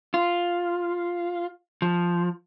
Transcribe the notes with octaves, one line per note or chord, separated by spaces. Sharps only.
F4
F3